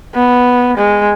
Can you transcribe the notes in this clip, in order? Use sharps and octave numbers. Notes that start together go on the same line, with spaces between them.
B3
G#3